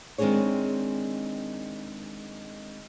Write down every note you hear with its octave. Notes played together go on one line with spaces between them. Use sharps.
D#3 G#3 C4 D4 G#4 C#5